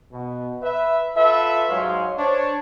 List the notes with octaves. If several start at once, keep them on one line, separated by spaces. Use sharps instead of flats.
B2
B4 E5
F4 A4 B4 E5
G#2 F#3 G#3 C#5 F5 C6
D4 C5 C#5